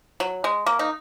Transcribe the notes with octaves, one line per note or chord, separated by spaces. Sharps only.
F#3
G#3
A#3
D#4